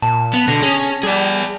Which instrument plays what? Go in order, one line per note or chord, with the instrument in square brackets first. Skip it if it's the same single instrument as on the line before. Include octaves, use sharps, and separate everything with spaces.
[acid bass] A#2 [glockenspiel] A5
[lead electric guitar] B3 [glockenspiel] F7
[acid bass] B2 [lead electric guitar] D3 [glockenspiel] A#6
[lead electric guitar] C#4 [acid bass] G#4
[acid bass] G3 [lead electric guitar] G#4 D5